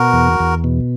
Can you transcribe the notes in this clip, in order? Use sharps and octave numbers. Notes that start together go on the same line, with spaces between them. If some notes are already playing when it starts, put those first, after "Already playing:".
Already playing: B2 F#4 A#4
E2
E2
B2